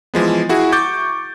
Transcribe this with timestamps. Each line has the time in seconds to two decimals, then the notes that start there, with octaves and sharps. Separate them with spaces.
0.14 E3 F3 G#3 B3
0.49 E4 F#4 G#4
0.72 C#6 D6 G6 A6